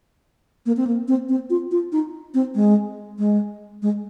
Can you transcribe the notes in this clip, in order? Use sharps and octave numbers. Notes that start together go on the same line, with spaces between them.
A#3
C4
A#3
C4
C4
F4
F4
D#4
C4
G#3
G#3
G#3